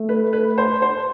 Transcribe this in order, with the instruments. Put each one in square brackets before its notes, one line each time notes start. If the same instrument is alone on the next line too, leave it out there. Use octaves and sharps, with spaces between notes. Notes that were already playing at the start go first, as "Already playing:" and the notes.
Already playing: [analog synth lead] A3
[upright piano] B4
B4
C5
C5